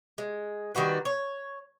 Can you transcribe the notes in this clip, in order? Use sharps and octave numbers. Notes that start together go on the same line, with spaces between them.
G#3
D#3 G3 F#4 B4
C#5